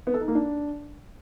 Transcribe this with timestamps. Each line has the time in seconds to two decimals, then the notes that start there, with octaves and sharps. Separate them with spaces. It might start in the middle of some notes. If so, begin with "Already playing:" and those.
0.07 B3
0.14 A4
0.21 D#4
0.28 A#3
0.35 D4